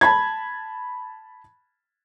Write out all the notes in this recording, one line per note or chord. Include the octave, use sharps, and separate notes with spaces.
A5 B5 G#6